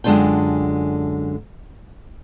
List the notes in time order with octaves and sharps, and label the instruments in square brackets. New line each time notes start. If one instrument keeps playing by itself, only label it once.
[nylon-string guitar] F#2 D3 G#3 D4 F4 G5